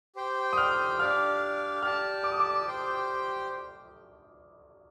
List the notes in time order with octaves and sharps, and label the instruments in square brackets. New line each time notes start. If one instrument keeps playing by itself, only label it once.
[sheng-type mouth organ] G4 C5 G5
[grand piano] D#6
F6
[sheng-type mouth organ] D4 G4 D5 F5 [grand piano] F6
[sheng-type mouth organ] G4 D5 A5 [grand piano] F6
[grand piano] D6
D#6
D6
[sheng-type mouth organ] G4 C5 G5